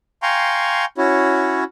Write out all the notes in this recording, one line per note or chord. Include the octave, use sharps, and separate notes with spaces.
F5 G5 G#5 A#5 C6 C#6
C#4 E4 F#4 C#5